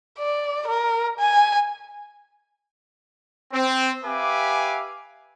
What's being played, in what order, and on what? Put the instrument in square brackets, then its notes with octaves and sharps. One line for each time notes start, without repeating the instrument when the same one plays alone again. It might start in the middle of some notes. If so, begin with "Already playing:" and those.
[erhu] D5
A#4
G#5
[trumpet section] C4
G4 B4 E5 F5 G#5 D6